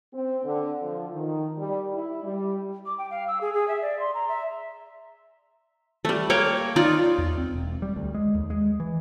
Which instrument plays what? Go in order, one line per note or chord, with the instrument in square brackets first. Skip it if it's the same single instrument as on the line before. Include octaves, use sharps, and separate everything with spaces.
[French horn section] C4
D3
F3
D#3
G3
E4
G3
[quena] D6
G5
F5
E6
G#4
G#4
E5
D5
C6
A#5
E5
[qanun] G3 A3
A#3 C#5 G5
D#4 F4 D5
[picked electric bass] E2
C4
E1
G3
D2
G#3
D#2
G#3
E3